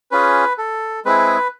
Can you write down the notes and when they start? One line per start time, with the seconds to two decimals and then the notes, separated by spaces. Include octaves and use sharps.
0.11 C#4 F4 G#4 B4
0.58 A4
1.05 G#3 C4 E4 G#4 B4